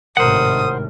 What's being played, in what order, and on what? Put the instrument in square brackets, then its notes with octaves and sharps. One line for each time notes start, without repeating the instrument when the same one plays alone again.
[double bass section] G#1 A2 C3 [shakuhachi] A#4 [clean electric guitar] C5 F#5 [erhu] D#6